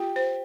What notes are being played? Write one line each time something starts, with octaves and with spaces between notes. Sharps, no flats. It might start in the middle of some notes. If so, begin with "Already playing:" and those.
Already playing: F4 G4
C5